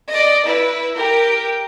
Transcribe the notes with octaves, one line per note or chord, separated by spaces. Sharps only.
D5 D#5
E4 B4
G4 A#4